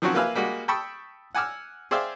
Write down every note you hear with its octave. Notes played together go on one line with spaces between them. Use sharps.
D#3 F3 F#3 C4 C#4 F#4
A#3 F4 B4 E5 F5 G#5
G3 G#3 A#3 F#4
G5 A5 B5 C#6 D#6 E6
F#5 G#5 D6 E6 F6
G#4 C5 D5 E5 F5 G5